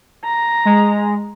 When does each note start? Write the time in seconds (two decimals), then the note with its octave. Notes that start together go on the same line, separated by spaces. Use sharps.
0.25 A#5
0.65 G#3